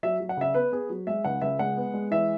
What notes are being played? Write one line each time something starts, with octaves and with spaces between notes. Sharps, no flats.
F#3 E5
F#3
F#5
C#3 E5
B3 B4
B3 G#4
F#3
G#3 E5
C#2 F#5
C#2 E5
G#3 F#5
B3
G#3
E3 E5